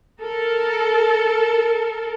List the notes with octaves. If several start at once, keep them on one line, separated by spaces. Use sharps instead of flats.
A4 A#4